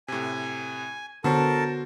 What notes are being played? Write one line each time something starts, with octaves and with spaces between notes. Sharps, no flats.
A2 C3 G#5
D3 B3 F#4 A4 A#4 C5 C#5 A5